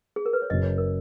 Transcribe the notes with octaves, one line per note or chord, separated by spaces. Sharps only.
G#4
A#4
B4
C#5
F#1 F#2 C#3 D#5
C#5
A#4